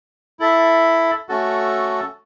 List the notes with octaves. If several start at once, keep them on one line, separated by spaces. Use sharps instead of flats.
E4 A4 E5
A3 C#4 F#4 A4